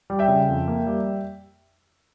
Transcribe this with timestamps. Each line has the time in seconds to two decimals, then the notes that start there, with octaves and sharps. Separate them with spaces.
0.10 G3
0.19 E5 G5
0.28 C#3
0.48 F2
0.68 A#3
0.86 G3